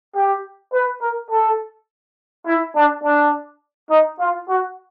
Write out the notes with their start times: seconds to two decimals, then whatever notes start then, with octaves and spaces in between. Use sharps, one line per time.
0.15 G4
0.73 B4
1.01 A#4
1.30 A4
2.46 E4
2.75 D4
3.03 D4
3.90 D#4
4.19 F4
4.48 F#4